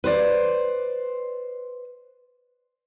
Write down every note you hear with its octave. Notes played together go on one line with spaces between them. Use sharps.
B4 C5 D5